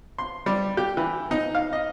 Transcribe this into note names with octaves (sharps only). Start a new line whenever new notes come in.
C6
G3
G4
E3
D#4
F5
D#5